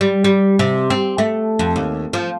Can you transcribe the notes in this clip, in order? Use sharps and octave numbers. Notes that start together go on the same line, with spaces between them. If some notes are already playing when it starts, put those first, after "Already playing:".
G3
G3
C3
C4
A3
F2
D#2
F3